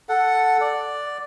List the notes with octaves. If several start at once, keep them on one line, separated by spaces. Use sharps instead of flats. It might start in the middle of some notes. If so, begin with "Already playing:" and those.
A4 F#5
D5